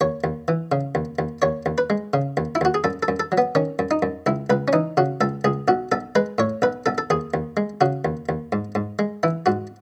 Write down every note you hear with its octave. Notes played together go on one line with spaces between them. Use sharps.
D#2 C#5
D#2
E3
C#3
D#2
D#2
D#2 C#5
D#2
B4
G#3
C#3
D#2
E4
D#2 F#4
G#4
F#2 A4
A4
F#2
A4
F#3
B3
D#3 C#4
F#2
D#4
F#2
C#2 E4
C#2 B4
C#4
E3 D#4
C#3 F#4
C#2 A4
C#2 G#4
B1 F#4
B1 A4
G#3 B4
A2 C#5
B1 B4
B1 A4
A4
D#2 G#4
D#2
G#3
C#3 F#4
D#2
D#2
G#2
G#2
G#3
E3 E4
G#2 F#4